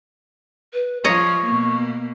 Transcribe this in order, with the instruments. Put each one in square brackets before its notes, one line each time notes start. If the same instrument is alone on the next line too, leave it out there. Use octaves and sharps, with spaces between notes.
[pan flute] B4
[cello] F3 [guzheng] C#5 D#5 A#5 [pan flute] C#6
[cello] B2 A#3